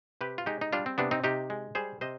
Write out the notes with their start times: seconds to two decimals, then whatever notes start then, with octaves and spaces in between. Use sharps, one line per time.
0.21 C3 G4 B4
0.38 F4
0.46 G#3 D#4 G4
0.61 D#4
0.73 G3 D4 F4
0.86 C4
0.98 C3 B3 D4
1.11 C4 D#4
1.24 C3 D#4 G4
1.50 G#3
1.75 G3 G#4 C5
2.01 C3 C5 D#5